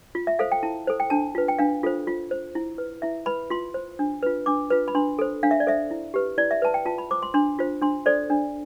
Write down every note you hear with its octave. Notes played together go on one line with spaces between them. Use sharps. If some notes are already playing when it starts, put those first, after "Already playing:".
F4
E5
A4 C5 F5
G5
E4 A5
A4 C5
G5
D4 A5
F4 B4
G5
D4 F5
F4 A4 C5
F4
C5
E4
B4
E4 E5
B4 B5
F4 C6
C5
D4
F4 B4
D4 D6
F4 B4
B5
D4 C6
A4 C5
D4 F5
E5
D5
A4 C5 E5
E4
G4 B4
E4 D5
E5
B4 A5
G5
F4 A5
B5
C5 D6
C6
D4 C6
F4 C5
D4 C6
A4 C5 D5
D4